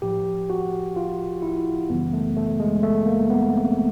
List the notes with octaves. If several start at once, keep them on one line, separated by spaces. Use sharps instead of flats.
A2 F3 G4
F#4
F4
E4
F#2 C#3 E3 G3 B3
A3
A3
G#3
A3
A#3
B3
C4